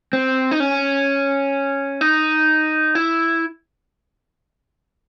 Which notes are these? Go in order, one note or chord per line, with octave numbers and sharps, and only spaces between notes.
C4
D#4
C#4
D#4
E4